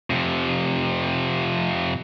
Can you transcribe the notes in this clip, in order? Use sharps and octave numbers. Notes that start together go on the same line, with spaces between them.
F2 C3